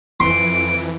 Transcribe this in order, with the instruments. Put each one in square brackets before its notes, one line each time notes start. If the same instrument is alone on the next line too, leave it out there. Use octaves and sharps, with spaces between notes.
[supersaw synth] F2 E3 [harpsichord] C6 [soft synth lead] D7